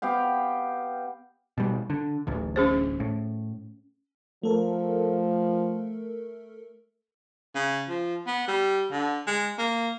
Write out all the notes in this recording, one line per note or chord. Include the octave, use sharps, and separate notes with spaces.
B3 G4 F5 G5
B2 G3
D3
D1 A1 D2
C#4 G#4 C5
A2
F3 A3 A4 A#4
C#3
F3
B3
G3
D3
G#3
A#3